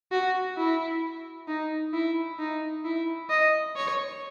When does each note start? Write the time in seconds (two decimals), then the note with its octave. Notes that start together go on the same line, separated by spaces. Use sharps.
0.12 F#4
0.57 E4
1.48 D#4
1.94 E4
2.39 D#4
2.85 E4
3.30 D#5
3.76 C#5